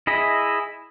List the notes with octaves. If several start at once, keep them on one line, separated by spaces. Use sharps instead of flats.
E4 G#4 D#5 E5